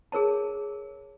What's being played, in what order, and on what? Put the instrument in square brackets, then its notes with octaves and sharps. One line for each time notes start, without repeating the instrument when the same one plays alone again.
[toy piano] G#4 A#4 C#5 A5